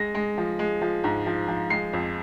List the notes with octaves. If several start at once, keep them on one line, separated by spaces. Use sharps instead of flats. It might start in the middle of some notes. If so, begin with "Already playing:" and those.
Already playing: G#3 A#6
G#3
F3
G#3
F3
G#2
F3
F3
G#3 C7
F2